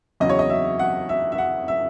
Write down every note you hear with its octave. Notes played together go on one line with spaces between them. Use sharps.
E2 C#3 F#3 D#5
C#5
D#5
E5
F#5
E5
E5
F#5
E5